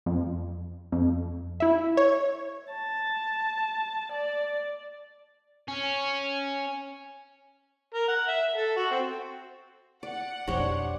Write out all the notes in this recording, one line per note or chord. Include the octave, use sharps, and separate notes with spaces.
F2
F2
E4 E5
C#5
A5
D5
C#4
A#4
F#5
E5
A4
F#4
C4
D5 F#5
E1 B1 F2 D4 G4 C5 C#5